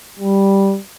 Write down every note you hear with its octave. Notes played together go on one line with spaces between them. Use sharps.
G3